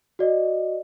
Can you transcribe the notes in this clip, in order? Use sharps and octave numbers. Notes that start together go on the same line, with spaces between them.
F#4 D5 D#5